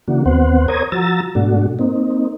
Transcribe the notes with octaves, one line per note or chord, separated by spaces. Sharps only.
C#3 E3 A#3 D4 F#4
D#2 B3 C4 C5 F#5
A#4 C5 C#5 A#5 D#6 G#6
F3 F#4 A#5 E6 A6
G#2 B2 A3 D4 F#4
A#3 C4 D#4